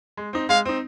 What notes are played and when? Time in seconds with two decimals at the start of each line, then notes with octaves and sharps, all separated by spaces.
0.17 G#3
0.33 C4 D#4
0.49 G#3 F5
0.65 C4 D#4